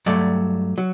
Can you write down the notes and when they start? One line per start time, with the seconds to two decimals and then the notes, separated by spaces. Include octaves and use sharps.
0.06 G2 F#3 A3 D5
0.78 F#3